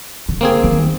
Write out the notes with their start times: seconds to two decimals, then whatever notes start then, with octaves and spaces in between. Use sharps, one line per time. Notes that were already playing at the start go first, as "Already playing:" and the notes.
0.29 D3
0.41 A#3 C4 G#4
0.64 D#3